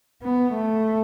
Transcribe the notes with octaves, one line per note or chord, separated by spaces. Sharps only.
B3
A3